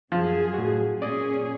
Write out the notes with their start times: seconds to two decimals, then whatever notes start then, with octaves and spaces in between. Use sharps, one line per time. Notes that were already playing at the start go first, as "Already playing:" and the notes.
0.12 F#2 F3 G#4
0.54 A2 F#4
1.02 A#2 C#4 G#4 D5 D#6